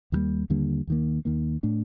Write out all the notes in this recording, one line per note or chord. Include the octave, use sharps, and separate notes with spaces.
D#2 D3 G3 A#3
D#2 D3 G3 A#3
D#2 D#3 A#3
D#2 D#3 A#3
A2 A3 D4